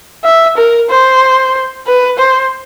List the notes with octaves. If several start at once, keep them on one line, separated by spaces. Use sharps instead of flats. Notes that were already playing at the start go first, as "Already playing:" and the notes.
E5
A#4
C5
B4
C5